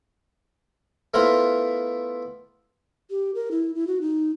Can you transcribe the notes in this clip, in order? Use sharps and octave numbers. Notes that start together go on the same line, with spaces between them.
A3 B3 E4 F4 A#4 C5
G4
A#4
E4
E4
F#4
D#4